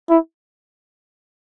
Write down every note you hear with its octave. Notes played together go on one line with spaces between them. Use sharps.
E4